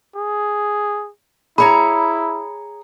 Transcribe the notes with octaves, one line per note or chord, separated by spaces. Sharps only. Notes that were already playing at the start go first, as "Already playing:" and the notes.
G#4
E4 G#4 C#5 A#5 B5